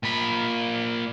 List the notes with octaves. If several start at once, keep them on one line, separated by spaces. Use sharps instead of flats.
A#2 B5